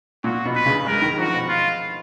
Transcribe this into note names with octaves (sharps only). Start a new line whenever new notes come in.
A#2 F#4
B2
B4
C#3
G#3 A#4
D#3
F3 F#4
B2
F4